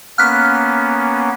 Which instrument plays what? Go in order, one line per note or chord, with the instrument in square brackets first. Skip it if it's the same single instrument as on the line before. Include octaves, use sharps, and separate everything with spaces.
[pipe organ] A#3 B3 C#4 [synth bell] F6 F#6 B6